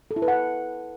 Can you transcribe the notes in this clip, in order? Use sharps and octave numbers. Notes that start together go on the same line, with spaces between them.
A4
E4
B4
F#5